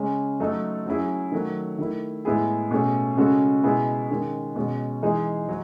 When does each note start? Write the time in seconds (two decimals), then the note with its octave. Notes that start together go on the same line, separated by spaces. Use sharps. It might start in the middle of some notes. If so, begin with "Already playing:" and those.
Already playing: C#3 G#3 C#4
0.40 F#3 A3 D#4 A4
0.86 F#3 C#4 E4 G#4
1.32 D#3 F#3 A3
1.79 D#3 A3 E4
2.25 A2 G#3 B3 E4 G#4
2.71 B2 A3 C#4 G#4
3.17 C#3 G#3 C#4 F#4 A4
3.64 B2 G#3 B3 E4 G#4
4.10 D#3 G#3 C#4
4.56 B2 G#3 C#4
5.03 E3 G#3 D#4 G#4
5.49 F#3